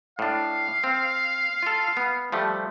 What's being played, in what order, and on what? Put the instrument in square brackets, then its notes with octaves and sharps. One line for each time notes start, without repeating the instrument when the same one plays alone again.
[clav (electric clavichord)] A2 D4 [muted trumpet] F5
[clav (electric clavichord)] C4
F4 A4
B3
F3 G3 A3